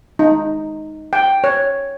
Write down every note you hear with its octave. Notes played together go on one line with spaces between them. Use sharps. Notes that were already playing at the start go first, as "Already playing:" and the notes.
D#4
G5
C#5